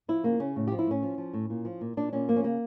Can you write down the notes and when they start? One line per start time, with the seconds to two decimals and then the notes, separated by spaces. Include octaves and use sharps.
0.08 F3 E4
0.23 C#3 A#3
0.40 C#3 C#4
0.56 A2
0.67 F3 G4
0.79 E4
0.87 A2 C#4
1.03 F3
1.18 F3
1.34 A2
1.50 A#2
1.65 F3
1.81 A#2
1.97 A#2 D4
2.13 A#2 C#4
2.29 F3 A#3
2.36 C#4
2.44 C#3 A#3